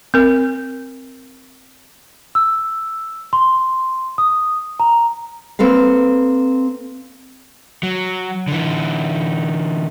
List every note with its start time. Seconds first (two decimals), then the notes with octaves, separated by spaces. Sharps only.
0.14 C4 A#4
2.35 E6
3.33 C6
4.18 D#6
4.80 A#5
5.59 A#3 C4 A4 B4 F5
7.83 F#3
8.48 D3 E3